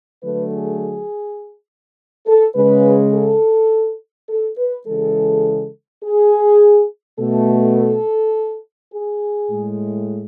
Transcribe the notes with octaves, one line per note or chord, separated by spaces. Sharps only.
D3 F#3 A3 B4
G#4
A4
C#3 G#3 B4
A4
A4
B4
C#3 E3 G#3 A4
G#4
B2 A3 A4
A4
G#4
A2 G#3